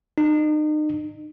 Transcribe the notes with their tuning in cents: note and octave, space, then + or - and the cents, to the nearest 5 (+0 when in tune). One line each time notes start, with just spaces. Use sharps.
D#4 -35